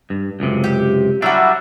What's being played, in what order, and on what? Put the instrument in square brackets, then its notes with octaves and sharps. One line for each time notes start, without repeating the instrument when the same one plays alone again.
[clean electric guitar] G2
C#2 F#2 C3
[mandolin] G4
[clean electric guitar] F#3 G3 D4 [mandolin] E4 F#4